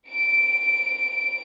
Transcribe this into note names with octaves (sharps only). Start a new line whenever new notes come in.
D7